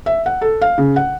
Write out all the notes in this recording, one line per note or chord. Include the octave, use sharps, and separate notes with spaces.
E5
F#5
A4
F5
C#3
F#5